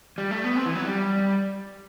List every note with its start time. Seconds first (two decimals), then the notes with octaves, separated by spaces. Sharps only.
0.18 G3
0.31 A3
0.44 B3
0.56 C4
0.66 E3
0.75 F#3
0.85 G3